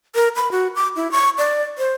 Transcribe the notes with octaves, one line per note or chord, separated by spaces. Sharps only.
A#4
B5
F#4
D6
E4
C#6
D5
C5